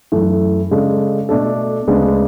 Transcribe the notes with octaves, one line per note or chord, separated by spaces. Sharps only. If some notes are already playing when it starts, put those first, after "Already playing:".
F#2 E3 A3
C#3 G#3 D4 A4
B2 A3 D4 A4
D2 C#3 G#3 B3 D4